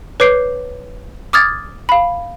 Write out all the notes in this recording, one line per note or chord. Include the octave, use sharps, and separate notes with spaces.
B4 C#5 D6 G6 C7 D7
D6 D#6 F6 G#6 A6
F5 B5